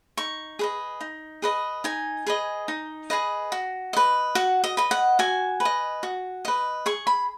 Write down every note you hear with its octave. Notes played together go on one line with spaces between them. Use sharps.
D#4 C#6
G#4 B4 D#5
D#4
G#4 B4 D#5
D#4 G#5
G#4 B4 D#5
D#4
G#4 B4 D#5
F#4
B4 D#5
F#4 F#5
D#5
B4 D#5
F#5
F#4 G#5
B4
D#5
F#4
B4 D#5
G#4 C#6
B5